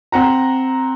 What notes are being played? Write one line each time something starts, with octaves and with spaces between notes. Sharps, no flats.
C4 F#5 A#5